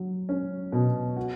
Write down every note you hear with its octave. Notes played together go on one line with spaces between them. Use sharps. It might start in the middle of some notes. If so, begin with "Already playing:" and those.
Already playing: F#3
C#4
B2
F#4